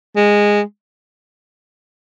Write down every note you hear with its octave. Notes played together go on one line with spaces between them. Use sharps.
G#3